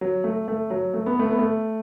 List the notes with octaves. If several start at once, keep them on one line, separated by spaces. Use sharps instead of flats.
F#3
A3
A3
F#3
A3
B3
A3
B3
A3